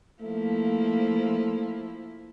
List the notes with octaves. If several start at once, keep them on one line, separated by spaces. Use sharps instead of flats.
F3 A3 A#3 E4